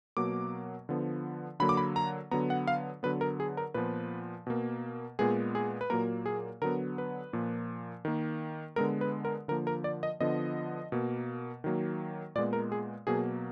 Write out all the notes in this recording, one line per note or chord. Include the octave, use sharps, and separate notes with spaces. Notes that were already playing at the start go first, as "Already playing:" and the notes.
B2 F#3 A#3 D6
D3 F3 B3
D3 F#3 A#3 B5
D6
B5
A#5
D3 F#3 B3 A#5
F#5
F5
D3 F#3 B3 B4
A#4
G#4
A#4
A#2 F3 B3 B4
B2 A#3
A#2 G#3 B3 G#4
G#4
B4
A#2 F#3 A#3 A#4
G#4
D3 F#3 B3 A#4
B4
A#2 F3 A#3
D#3 A#3
D3 G#3 B3 A#4
B4
A#4
D3 F3 A#3 A#4
A#4
D5
D#5
D3 F3 B3 D#5
B2 A#3
D#3 F#3 A#3
A#2 G#3 B3 D5
A#4
G#4
B2 F#3 A#3 G#4